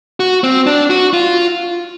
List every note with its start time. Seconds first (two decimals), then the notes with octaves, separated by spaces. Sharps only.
0.20 F#4
0.44 C4
0.67 D4
0.90 F#4
1.13 F4